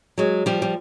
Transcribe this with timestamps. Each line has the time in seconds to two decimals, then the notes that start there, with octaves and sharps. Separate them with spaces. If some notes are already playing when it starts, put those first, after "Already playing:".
0.18 F#3 G#3
0.46 F3 G3
0.62 G3